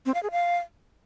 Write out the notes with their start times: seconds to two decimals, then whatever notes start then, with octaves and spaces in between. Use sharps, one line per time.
0.06 C4
0.14 F5
0.23 G#4
0.32 F5